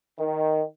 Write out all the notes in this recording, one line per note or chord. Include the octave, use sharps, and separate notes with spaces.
D#3